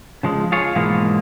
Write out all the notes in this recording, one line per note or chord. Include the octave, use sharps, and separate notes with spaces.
C#3 F3 G#3
F4 G#4 C#5
G#2 B2 E3 F3 G#3 A#3